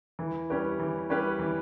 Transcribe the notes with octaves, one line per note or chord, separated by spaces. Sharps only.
E3
G3 C#4 G4 B4
E3
G3 C#4 G4 B4
E3